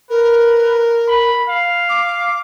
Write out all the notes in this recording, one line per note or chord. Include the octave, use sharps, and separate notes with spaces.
A#4 B4
B5
F5
D6